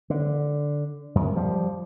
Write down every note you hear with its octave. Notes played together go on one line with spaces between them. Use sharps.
D3
F#2
F3 G3